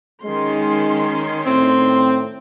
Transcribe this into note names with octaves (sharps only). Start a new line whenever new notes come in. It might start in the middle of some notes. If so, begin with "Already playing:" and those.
D#3 G#3 C#4 C6
A2 C4